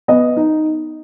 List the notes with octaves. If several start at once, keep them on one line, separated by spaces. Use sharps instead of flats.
B3 D#5
D#4